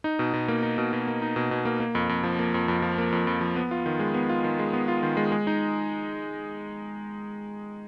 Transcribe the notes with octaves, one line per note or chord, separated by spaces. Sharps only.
D#4
B2
B2
A#3
D#4
B2
B2
A#3
D#4
B2
B2
A#3
A#3
F2
F2
F3
A#3
F2
F2
F3
A#3
F2
F2
F3
B3
F4
D#3
G#3
B3
F4
D#3
G#3
B3
F4
D#3
G#3
G#3
D#4